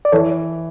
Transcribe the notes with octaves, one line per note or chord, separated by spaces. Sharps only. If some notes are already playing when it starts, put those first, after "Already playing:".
D5
E3 A4 C#5